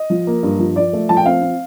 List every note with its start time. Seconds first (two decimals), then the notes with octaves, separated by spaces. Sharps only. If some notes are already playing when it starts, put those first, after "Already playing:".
Already playing: D#5
0.10 F3
0.27 A#3
0.43 G2
0.59 F3
0.76 F3 D5
0.93 A3
1.09 F3 A5
1.17 G5
1.26 C4 F5
1.42 C4